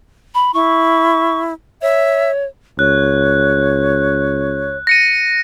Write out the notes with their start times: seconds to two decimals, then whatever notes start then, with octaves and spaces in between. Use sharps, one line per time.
0.35 B5
0.54 E4 C#6
1.82 C#5 E5
2.79 C#2 C#5 F#6
4.87 A#6 C#7 D#7